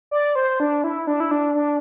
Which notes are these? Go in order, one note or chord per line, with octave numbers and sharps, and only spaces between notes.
D5
C5
D4
E4
D4
E4
D4
D4